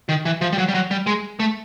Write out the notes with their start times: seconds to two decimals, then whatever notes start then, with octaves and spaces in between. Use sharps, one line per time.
0.09 D#3
0.25 E3
0.41 F3
0.53 G3
0.58 F#3
0.68 G3
0.74 F#3
0.91 G3
1.07 G#3
1.40 A3